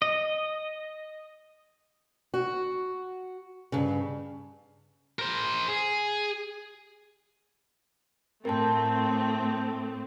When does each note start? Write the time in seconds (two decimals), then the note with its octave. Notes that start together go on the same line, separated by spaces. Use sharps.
0.02 D#5
2.34 F#4
3.72 G2 C#3
5.19 A#4 C5
5.68 G#4
8.45 A2 A3 C4 A#4 A5